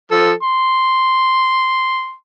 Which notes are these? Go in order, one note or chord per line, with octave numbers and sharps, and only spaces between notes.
F3 A4
C6